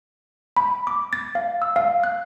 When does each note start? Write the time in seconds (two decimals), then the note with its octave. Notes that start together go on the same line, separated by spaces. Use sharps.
0.57 B5
0.87 D6
1.13 A6
1.35 F5
1.62 E6
1.76 F5
2.04 F#6